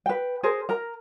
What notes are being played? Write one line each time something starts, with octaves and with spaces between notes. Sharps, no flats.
B4 G5
G#4 A#4 C5
A#4 A#5